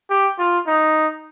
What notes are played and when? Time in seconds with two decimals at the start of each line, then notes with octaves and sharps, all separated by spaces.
0.10 G4
0.39 F4
0.67 D#4